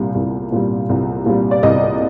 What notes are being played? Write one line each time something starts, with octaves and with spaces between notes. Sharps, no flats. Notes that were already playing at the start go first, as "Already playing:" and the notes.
Already playing: C2 A#2 G3
C2
A#2 G3
C2
A#2 G3
D5
C2 D#5